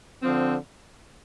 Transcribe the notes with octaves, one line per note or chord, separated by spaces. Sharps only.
D3 F3 C4